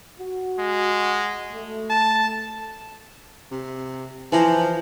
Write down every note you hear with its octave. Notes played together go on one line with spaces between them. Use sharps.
F#4
G#3
A3
A5
C3
E3 F3 C5 A#5